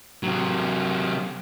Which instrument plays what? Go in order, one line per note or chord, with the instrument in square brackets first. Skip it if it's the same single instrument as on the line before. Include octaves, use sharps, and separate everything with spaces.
[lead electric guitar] C3 F#3